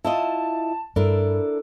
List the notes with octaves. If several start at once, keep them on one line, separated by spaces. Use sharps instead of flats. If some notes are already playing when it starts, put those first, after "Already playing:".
E4 F4 D#5 A5
G2 D4 E4 A4 A#4